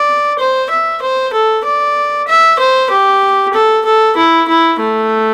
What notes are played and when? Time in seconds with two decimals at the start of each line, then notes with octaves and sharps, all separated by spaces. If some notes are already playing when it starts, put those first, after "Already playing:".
Already playing: D5
0.39 C5
0.70 E5
1.02 C5
1.33 A4
1.65 D5
2.27 E5
2.59 C5
2.90 G4
3.54 A4
3.85 A4
4.17 E4
4.48 E4
4.80 A3